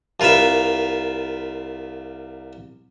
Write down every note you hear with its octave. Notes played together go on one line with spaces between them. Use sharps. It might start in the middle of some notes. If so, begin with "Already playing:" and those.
C2 F4 A#4 B4 E5